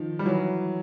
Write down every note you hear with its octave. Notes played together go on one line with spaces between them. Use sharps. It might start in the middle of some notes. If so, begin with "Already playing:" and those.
Already playing: D#3 F3
G3
E3 F#3